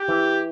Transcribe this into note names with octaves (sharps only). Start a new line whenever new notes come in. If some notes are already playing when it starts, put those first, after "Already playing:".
Already playing: G4
E3